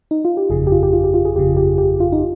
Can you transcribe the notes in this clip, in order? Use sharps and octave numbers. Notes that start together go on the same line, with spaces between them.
D#4
F4
G4
G1 F2 C#3 G#4
G4
F4
G4
F4
G4
F4
G#4
G1 F2 C#3 G4
G4
G4
F4
D#4